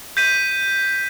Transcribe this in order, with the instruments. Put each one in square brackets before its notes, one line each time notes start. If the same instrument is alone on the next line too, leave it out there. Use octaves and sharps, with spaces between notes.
[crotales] G6 B6 D#7